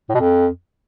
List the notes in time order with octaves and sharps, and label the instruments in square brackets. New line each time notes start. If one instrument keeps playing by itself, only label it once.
[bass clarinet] A2
B2
F2